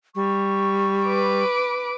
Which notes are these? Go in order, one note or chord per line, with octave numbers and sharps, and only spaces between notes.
G3 C#6
B4 D6